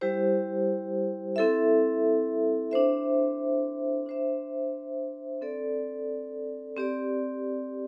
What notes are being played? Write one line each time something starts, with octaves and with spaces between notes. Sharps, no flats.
G3 E4 G4 C5
C4 E4 A4 E5
D4 C5 E5
D4 C5 E5
C4 A4 D5
C4 G4 D5